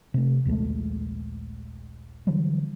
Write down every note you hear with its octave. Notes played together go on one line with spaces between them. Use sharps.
C3 A3
A#1 D#2 G#3 A3
D3 E3 F#3 G3